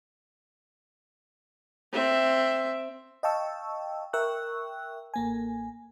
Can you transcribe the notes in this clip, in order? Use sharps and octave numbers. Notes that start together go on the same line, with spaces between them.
C4 E5
D#5 F5 G5 A5 C#6 E6
A#4 E5 G5 C#6 E6 F#6
A1 A#3 G#5